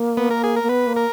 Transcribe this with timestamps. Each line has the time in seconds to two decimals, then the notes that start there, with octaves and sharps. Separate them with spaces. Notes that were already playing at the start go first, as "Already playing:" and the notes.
Already playing: A#3
0.17 B3
0.30 A#4
0.44 G#4
0.56 A#4
0.63 A#3
0.69 B3 B4
0.87 A#3
0.96 A#4